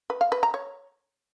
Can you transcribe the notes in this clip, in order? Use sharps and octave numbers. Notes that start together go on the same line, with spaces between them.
B4
F5
B4
A#5
C#5